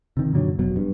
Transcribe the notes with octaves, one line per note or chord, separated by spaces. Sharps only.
C3 D#3
F#2 A#2 D3 F#3
F1 B2 F#3
G2